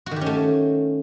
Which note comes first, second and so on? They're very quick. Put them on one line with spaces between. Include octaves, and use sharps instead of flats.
F#4 D#3 G4 C#4 A3